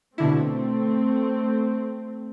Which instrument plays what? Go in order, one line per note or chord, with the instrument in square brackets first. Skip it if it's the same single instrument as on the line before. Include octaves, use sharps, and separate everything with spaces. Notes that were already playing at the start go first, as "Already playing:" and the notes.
[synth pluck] B2 D3 E4 [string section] A3 C4